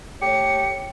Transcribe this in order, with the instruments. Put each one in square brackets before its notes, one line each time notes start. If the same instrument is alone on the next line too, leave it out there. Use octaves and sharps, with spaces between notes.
[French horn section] A3 A4 C#5 [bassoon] G4 [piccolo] C#7